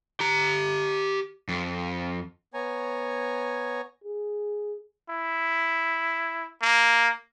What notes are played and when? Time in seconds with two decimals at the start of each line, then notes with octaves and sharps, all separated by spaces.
0.20 G4 A#5
1.48 F2
2.54 B3 C#5 G#5 A#5
4.04 G#4
5.10 E4
6.62 A#3